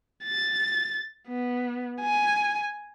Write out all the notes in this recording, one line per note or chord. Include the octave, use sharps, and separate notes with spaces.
A6
B3
G#5